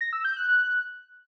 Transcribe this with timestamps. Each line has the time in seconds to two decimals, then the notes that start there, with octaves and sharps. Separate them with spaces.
0.01 A#6
0.13 E6
0.25 G6
0.36 F#6
0.48 F#6